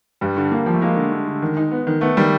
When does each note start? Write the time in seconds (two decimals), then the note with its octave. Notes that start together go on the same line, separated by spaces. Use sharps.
0.21 G2 G3
0.37 D3
0.51 A#3
0.66 F3
0.74 A3
0.81 G#3 A#3
0.96 D3
1.12 D3
1.27 D3
1.42 D#3
1.57 D#4
1.71 B3
1.87 D#3
2.01 A3 B3
2.17 D#3 G3